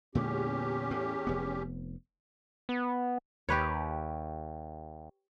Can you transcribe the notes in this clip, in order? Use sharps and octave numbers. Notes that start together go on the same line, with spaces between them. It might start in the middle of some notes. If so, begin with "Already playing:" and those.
E2 A#2 D3 G#3 C#4 G4
A2
F1 B3
B3
D#2 G4 B4 C#5